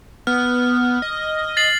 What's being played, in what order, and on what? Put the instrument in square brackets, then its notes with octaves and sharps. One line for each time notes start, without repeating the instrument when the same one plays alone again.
[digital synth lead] B3 [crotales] F6
[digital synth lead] D#5
[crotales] A6 C7 F#7